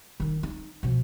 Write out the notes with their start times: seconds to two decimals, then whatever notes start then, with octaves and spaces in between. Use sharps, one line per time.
0.20 D#3 D#4
0.43 D#4
0.83 B2 F3